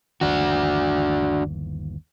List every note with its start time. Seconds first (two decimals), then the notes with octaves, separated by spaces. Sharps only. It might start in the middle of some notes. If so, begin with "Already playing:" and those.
0.21 G1 D#2 E3 D4 F#4